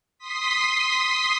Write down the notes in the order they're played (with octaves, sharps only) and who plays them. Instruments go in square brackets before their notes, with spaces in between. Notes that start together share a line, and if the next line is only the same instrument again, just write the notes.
[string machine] C6 D#6 B6